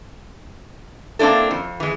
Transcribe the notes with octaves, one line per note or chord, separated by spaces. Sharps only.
A#3 C4 D4 E4 A4
F2
E3 G#3